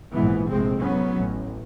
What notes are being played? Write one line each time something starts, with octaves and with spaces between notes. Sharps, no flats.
A#1 G#2 E3 B3
F1 A#1 A2 G#3 C4
A2 F#3 B3 C#4
A1